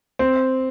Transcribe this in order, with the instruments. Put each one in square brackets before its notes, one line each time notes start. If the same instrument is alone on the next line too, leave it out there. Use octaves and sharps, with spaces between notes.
[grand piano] C4